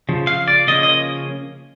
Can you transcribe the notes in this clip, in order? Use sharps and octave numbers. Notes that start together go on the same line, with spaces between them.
C#3 F3
F5
D5
C#3 F3 A#3 C#4 D#5
D#5